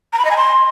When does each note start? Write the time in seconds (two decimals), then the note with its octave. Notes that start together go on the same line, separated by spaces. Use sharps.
0.13 A#5
0.19 B5
0.25 D#5
0.31 G#5
0.37 C6